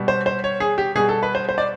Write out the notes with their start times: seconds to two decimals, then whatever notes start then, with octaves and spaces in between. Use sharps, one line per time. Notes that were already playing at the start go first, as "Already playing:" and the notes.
Already playing: B2 G3
0.08 C5
0.26 C5
0.44 C#5
0.60 G#4
0.78 G4
0.95 B2 G3 G#4
1.09 A4
1.23 B4
1.35 C5
1.49 C5
1.58 D5